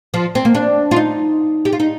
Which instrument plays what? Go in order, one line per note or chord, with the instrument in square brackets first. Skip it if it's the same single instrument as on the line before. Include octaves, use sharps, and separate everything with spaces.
[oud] F3
C4
A#3
D4
F4
D#4
G4
F4
D#4